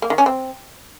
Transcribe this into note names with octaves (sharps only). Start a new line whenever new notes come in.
A#3
D#3
C#4
C4